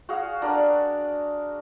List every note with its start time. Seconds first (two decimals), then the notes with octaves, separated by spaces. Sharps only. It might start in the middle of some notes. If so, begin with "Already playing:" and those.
0.09 F#4 G#4 F5
0.42 D4 F#4 A#4 D5